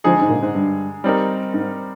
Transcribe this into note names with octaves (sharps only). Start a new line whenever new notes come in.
D3 F3 G#3 D#4 G#4
G#2
A#2
G#2
G2
G3 C4 D#4 A#4
G#2